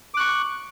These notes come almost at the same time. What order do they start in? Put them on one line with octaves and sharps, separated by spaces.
D6 F#6 C#6